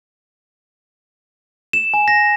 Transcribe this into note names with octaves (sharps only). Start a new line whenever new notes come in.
E7
G#5
A#6